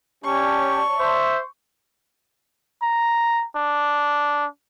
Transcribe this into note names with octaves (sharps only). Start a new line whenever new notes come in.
C#4 G4 C#5 D5 A5 C#6
C5 E5
A#5
D4